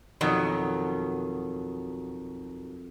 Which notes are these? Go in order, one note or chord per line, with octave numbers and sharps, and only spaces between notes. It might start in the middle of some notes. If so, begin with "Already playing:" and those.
F2 B2 D#3 F#3